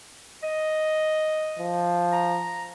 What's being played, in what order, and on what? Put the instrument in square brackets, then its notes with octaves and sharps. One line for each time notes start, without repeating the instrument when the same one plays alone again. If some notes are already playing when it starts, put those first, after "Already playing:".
[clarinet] D#5
[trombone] F3
[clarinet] A#5